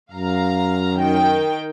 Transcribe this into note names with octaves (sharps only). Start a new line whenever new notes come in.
F#2 F5 A#5
D#3 G5